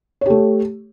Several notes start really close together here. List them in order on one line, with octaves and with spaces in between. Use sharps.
C#5 G4 A3